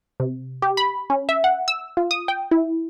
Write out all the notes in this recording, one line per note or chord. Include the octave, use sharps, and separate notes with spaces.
C3
G4
B5
C#4
E5
F#5
E6
F4
D#6
G5
E4